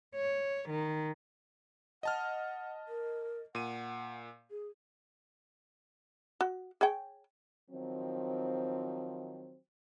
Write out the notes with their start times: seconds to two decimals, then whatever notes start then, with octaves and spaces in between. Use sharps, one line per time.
0.15 C#5
0.69 D#3
2.03 D#5 F#5 A5 F6
2.88 A#4
3.55 A#2 F#5 D#7
4.51 G#4
6.41 F#4
6.81 G#4 C#5 G5
7.70 D#3 F3 F#3 C4